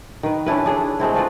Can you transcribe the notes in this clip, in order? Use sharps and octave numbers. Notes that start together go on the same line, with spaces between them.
D#3 B4
C#4 D4 E4 B4
D4 G#4 A4
G#3 A3 C4 E4
C4 D4 F4 B4